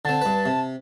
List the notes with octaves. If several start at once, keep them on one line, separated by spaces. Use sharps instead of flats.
D3 C4 A5
G2 B4
C3